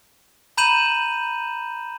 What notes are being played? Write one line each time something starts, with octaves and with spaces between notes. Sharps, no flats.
A#5 B5 G6 D#7 E7 F#7